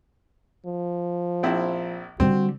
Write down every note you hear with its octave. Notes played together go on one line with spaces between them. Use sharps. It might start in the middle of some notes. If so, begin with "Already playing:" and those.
F3
A#1 C4 E4
D3 G3 C4 F#4